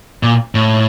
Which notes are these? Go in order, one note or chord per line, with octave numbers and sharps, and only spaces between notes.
A#2
A2